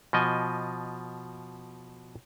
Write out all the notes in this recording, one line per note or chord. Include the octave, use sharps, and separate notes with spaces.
B2 F3 D#5 G#5